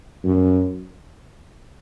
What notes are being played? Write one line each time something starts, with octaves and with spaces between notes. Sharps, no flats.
F#2